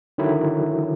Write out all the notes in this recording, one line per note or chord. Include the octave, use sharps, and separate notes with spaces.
D3 D#3 F#3 E4